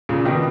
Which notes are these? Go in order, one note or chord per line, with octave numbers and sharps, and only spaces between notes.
A#2 C#3
B2 D#3